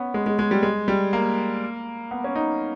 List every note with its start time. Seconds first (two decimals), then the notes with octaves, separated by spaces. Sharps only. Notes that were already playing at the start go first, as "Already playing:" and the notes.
Already playing: B3 C#4
0.14 G#3
0.26 G#3
0.39 G#3
0.51 G3
0.63 G#3
0.88 G3
1.13 A#3
2.11 B3
2.24 C#4
2.35 D#4